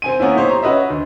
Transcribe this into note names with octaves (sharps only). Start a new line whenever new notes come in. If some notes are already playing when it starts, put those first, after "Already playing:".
C4 G#5 D#7
A#3 B3 C#4 E4
D#4 G4 C5 C#5
A#5 C6
C#4 F#4 B4 D#5 E5
D2